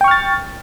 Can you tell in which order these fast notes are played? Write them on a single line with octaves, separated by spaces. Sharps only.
G5 C#6 F6 A6